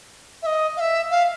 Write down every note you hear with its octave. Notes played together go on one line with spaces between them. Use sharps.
E5
D#5
F5
E5
F5